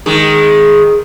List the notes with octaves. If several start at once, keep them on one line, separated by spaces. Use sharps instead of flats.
D#3 G#3